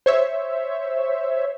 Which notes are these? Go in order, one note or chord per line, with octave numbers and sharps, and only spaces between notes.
C5 C#5 E5